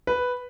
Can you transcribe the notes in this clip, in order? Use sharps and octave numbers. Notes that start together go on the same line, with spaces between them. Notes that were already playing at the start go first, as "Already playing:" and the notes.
B4